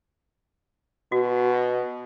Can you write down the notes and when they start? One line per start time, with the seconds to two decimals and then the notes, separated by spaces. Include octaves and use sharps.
1.12 B2 F#4